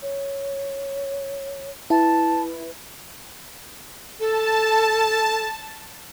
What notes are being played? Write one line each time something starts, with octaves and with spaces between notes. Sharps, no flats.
C#5
E4 B4 A5
A4 A5